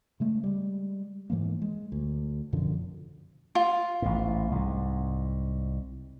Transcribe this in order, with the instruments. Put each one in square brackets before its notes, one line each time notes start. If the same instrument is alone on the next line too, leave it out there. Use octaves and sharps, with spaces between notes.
[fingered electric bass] C#3 G#3 A3
G3 G#3
G#2 E3 G#3 A#3
G#3
D2
F#2 B2 D3 F3
[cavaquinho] F4
[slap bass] A1 G#2
C2 G#2